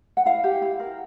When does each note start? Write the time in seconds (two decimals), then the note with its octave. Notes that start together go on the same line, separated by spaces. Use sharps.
0.17 F#5
0.26 E4 F5
0.44 G4
0.62 E4
0.80 A#4